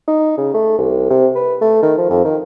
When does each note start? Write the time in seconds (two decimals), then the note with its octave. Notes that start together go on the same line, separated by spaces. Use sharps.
0.08 D#4
0.37 C#3
0.54 A3
0.78 C2
1.10 C3
1.35 B4
1.61 A3
1.82 D#3
1.98 F3
2.10 F2
2.25 D#3